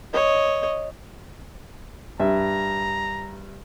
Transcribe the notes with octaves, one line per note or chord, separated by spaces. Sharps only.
C#5 D#5
G2 E5 A#5